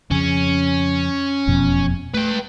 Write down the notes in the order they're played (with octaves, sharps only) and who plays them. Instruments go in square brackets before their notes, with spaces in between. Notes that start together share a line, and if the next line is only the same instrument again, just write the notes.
[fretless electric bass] F2 C#3 [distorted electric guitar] C#4
[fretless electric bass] E1 F2 B2
[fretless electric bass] A3 [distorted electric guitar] B4 G5